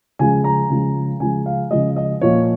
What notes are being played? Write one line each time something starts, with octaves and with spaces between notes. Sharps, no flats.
C#3 F3 G#3 G#5
A#5
C#3 F3 G#3
C#3 F3 G#3 G#5
F5
C#3 F3 G#3 D#5
D#5
A#2 F3 A#3 C#5